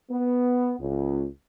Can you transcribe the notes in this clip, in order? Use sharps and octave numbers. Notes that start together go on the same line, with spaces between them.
B3
C#2